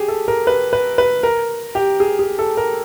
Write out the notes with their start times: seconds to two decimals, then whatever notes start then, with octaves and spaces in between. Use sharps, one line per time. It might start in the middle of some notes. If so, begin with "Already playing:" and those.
Already playing: G4 G#4
0.08 A4
0.28 A#4
0.47 B4
0.73 B4
0.98 B4
1.23 A#4
1.75 G4
2.00 G#4
2.19 G#4
2.39 A4
2.57 A#4